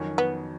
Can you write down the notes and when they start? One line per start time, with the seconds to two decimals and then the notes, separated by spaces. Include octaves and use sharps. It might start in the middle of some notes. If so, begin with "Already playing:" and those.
Already playing: F2 D#3 F#3 C#4 F#4
0.18 B3